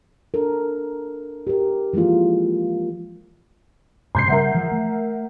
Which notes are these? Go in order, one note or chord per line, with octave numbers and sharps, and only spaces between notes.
D4 A4 A#4
G4 A#4
E3 F3 G#3 A#3 F4
G2 C3 G#3 C6 G6 C7
C#3 G3 A#4 E5 F#5
E3 F3 G#3
A3